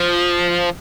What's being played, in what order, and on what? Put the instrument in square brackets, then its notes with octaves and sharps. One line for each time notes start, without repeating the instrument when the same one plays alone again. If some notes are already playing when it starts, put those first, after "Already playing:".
Already playing: [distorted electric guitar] F3